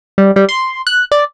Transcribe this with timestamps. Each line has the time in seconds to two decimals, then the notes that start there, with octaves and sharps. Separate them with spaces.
0.18 G3
0.36 G3
0.49 C6
0.87 F#6
1.12 D5